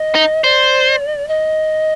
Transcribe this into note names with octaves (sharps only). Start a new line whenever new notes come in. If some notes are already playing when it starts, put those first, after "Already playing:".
Already playing: D#5
D#4
C5 D5
D#5